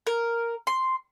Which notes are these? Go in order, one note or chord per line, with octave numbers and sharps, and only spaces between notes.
A#4
C6